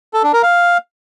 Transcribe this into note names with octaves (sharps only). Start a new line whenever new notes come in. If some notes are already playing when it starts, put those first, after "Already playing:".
A4
D4
A#4
F5